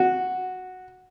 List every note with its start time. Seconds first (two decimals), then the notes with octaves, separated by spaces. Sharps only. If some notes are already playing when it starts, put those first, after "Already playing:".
Already playing: F#4